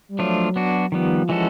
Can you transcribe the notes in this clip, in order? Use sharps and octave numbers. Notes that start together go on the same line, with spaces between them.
G3
F3 F#3 A3 D4 F4
B3 D4 F#4
D#3 F3 G3 B3
E3 G#3 C#4 F#4 A4